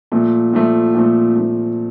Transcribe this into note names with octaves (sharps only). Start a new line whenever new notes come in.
A#2 F3 A3
A#2 F3 A3
A#2 F3 A3
A#2 F3 A3